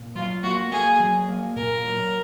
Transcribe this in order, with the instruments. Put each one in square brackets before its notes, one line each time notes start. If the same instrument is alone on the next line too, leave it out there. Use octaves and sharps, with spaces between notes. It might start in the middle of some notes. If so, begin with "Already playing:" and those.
Already playing: [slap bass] A#2
[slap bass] F#3 [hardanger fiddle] F4
[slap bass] A#3 [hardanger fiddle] F#4
[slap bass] A#3 [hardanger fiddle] G#4
[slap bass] F#3
A#3
[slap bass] A#2 [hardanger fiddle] A#4
[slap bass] F#3